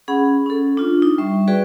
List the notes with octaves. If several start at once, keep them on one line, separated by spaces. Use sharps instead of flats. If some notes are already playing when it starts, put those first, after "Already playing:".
C#4 G#4 F#5 B5
C#4 A4
D4 F4
D#4
G3 E5 C#6
F#4 G#4 B4 D5 G5